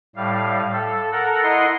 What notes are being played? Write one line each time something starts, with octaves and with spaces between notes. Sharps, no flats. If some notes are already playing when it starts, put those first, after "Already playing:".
A2 G3 F5
A4
A4 A#4 F#5
E4 D#5 F#5 C6